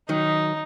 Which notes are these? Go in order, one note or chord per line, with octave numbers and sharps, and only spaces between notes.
D#3 F#3 D#4